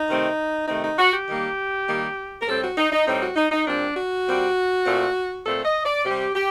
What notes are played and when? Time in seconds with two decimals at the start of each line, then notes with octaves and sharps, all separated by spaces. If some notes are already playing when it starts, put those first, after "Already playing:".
Already playing: D#4
0.09 C3 D#3 A3 C4
0.68 C3 D#3 A3 C4 D#4
0.83 D#4
0.98 F#4
1.13 G4
1.28 D#3 G3 A#3
1.88 D#3 G3 A#3
2.41 A#4
2.47 A2 G3 C4 A4
2.62 F#4
2.78 D#4
2.92 D#4
3.07 A2 G3 C4 D#4
3.21 F#4
3.36 D#4
3.52 D#4
3.67 A#2 G3 C4 D4
3.96 F#4
4.27 A#2 G3 C4
4.86 A#2 A3 C4
5.46 A#2 A3 C4 A4
5.65 D#5
5.85 D5
6.05 C3 G3 C4 G4
6.35 G4